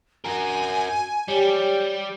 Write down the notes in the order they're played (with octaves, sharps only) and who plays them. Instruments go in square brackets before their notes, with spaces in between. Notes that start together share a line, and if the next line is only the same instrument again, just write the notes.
[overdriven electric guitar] F#4 A#4 [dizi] G#5
[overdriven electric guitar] G3 [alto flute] G4 [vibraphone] C#5 D5